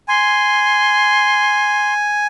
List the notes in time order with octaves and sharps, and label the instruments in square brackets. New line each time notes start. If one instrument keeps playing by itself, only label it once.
[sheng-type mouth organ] G#5 [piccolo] C6